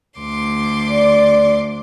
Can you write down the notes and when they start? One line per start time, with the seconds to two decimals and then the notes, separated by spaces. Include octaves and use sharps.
0.20 D2 C6 D6
0.89 D5